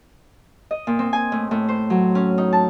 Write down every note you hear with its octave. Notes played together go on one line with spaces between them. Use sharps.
D#5
A#2
C4
G#5
A2
A2
C5
F#3
C#4
D#4
A5